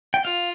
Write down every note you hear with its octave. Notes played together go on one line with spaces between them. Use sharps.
G5
F4 F5